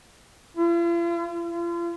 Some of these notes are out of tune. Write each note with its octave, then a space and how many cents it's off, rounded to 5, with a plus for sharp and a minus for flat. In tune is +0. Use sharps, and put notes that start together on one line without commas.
F4 -45
F4 -35